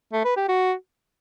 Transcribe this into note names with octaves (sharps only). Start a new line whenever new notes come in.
A3
B4
G4
F#4